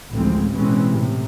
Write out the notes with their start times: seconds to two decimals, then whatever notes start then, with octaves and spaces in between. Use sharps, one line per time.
0.13 A1 D2 F3 G#3 C4
0.52 B2 E3 G#3 C4 C#4
0.90 A2 C3